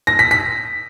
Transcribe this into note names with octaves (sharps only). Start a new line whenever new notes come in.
A#6
B6
B6